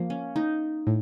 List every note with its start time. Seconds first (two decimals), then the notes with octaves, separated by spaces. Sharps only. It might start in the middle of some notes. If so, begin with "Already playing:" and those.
Already playing: F3 A#3
0.10 C#4
0.36 D#4
0.87 A2